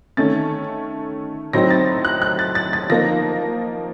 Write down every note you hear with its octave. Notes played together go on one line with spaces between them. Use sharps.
D#3 A3 C#4 A6
A2 F#3 C4 D#4 A#6
A6
F#6
F#6
A6
A6
A6
F3 A#3 D#4 A#6